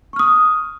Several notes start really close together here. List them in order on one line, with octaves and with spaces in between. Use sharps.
C#6 F6 D#6